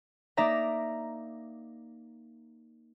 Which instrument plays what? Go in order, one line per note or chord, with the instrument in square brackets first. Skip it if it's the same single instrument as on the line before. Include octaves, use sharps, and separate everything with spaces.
[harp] A#3 D#4 D5 E5 A#5